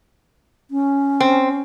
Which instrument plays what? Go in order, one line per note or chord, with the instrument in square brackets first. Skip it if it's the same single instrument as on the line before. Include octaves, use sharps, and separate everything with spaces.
[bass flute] C#4
[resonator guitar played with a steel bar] C4